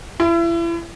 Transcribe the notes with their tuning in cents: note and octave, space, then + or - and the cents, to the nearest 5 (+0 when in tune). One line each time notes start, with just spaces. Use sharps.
E4 +35